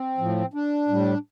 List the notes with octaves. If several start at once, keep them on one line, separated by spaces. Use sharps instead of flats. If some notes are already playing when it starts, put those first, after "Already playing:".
Already playing: C4
A2 F3
D4
A2 G3